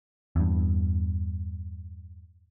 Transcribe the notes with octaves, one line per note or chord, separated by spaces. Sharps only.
E2 G2